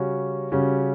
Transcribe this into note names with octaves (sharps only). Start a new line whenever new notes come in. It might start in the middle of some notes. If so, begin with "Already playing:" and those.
Already playing: C#3 G3 C#4 F#4
C#3 G3 C#4 F#4